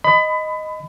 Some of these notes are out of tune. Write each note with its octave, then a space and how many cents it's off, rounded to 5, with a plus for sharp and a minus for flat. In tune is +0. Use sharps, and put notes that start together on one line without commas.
D#5 +0 B5 +25